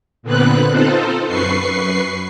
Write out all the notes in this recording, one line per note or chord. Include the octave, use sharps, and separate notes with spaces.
A#2 D3 B3 C4 B4 F#6
C4 D#4 F4 A4 C5
F#2 B4 C#6 C7